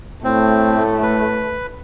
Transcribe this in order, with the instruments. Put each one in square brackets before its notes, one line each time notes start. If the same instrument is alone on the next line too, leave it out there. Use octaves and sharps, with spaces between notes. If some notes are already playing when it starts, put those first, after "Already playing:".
[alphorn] A2 [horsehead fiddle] A3 [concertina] C4
[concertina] B4